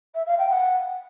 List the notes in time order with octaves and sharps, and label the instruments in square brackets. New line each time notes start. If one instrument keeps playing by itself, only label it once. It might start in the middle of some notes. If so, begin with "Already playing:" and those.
[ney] E5
F5
G5
F#5